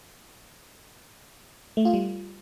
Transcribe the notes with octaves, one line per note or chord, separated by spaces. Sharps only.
A3
F4
G3